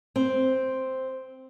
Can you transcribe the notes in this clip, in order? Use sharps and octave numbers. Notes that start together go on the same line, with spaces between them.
C4